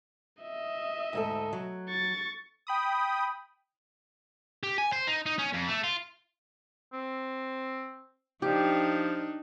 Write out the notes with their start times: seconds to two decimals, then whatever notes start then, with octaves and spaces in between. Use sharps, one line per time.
0.42 D#5 E5
1.13 D2 G#2 A4
1.53 F#3
1.89 C#6 A6
2.67 G5 B5 D#6
4.63 G4
4.78 G#5
4.93 C5
5.07 D#4
5.26 D#4
5.38 C#4
5.53 F2
5.68 A3
5.84 F4
6.93 C4
8.42 F3 D4 D#4 G4